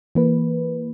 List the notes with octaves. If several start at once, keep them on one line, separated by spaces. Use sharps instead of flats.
E3 A#3 B4